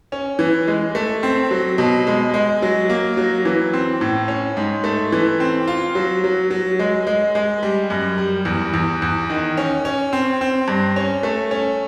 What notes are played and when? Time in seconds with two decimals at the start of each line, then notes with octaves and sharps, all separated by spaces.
0.12 C#4
0.39 E3
0.67 G#3
0.95 A3
1.23 C4
1.51 F#3
1.78 B2
2.07 G#3
2.34 G#3
2.62 F#3
2.90 A#3
3.17 F#3
3.45 E3
3.73 C4
4.01 A2
4.28 C#4
4.57 G#2
4.84 A3
5.12 E3
5.40 C4
5.68 F4
5.95 F#3
6.24 F#3
6.51 F#3
6.79 G#3
7.07 G#3
7.35 G#3
7.63 G3
7.90 F#2
8.18 G3
8.45 E2
8.74 E2
9.02 E2
9.30 D#3
9.57 C#4
9.85 C#4
10.13 C4
10.41 C4
10.68 G2
10.96 C#4
11.23 A3
11.51 C#4